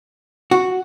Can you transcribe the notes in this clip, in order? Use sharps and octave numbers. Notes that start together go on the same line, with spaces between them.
F#4